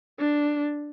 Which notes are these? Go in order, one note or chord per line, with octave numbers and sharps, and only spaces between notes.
D4